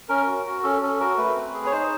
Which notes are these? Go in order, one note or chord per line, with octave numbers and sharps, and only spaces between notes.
C#4 A#4
F#4
F#4
C#4 A4
C#4 A4
F#4 A#4
A3 B4
C4
G#4
C#5
D#4 C5